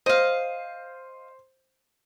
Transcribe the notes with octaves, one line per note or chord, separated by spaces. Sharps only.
C5 D#5 F5